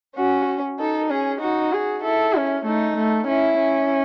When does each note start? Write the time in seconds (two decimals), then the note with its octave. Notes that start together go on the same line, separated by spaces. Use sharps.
0.17 C#4 F#4
0.79 D#4 A4
1.10 C#4 G#4
1.41 D#4 F#4
1.72 G#4
2.03 E4 A4
2.35 C#4
2.65 A3 D#4
2.97 A3
3.28 C#4 E4
3.59 C#4